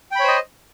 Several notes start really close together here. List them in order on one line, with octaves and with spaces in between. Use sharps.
G5 B5 C#5 C5 D#5